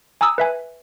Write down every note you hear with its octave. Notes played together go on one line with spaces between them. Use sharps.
G#5 A#5 D#6 E6
B4 E5 G#5